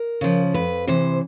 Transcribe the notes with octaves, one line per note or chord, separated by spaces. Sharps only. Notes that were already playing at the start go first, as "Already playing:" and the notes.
Already playing: A#4
C#3 F3
F2 B4
C3 E3 C5